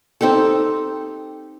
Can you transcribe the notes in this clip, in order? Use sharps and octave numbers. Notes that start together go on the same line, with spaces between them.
C4 D#4 G4 A4